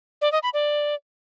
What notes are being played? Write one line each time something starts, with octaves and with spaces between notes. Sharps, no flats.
D5
D#5
B5
D5